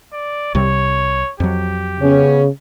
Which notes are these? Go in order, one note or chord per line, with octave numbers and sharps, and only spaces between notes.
D5
C2 C3 G3 C#5
F2 F#3 G4
C#3 B3 C#4